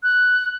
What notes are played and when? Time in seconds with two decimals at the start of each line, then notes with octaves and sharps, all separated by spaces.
0.03 F#6